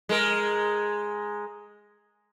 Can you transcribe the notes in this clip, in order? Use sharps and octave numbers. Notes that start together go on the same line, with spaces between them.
G#3 A#4